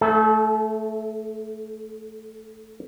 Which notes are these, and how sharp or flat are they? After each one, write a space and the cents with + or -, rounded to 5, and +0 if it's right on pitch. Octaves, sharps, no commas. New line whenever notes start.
A3 +0 A4 -35